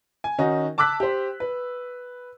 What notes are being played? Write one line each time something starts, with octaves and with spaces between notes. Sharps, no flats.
G#5
D#3 C#4 D#4 F#4
A5 D6 E6 F#6 B6
G4 C5
B4